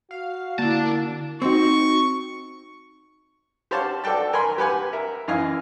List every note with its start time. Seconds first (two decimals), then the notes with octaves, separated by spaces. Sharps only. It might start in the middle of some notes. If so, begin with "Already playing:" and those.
0.11 F#4 F5
0.59 D3 A#3 D4 E4 A5
1.42 C4 D#4 F#4 C6 C#6
3.71 G4 C5 C#5 F5 F#5 A5
4.04 F#4 A4 D5 G5 A5
4.33 A#4 G#5 B5 C6
4.58 G4 B4 F#5 G#5
4.93 A#4 E5
5.28 F#2 E3 D#5 F5 G#5